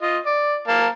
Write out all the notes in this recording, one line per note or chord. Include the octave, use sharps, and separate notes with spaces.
F4 D#5
D5
A#3 F5 A5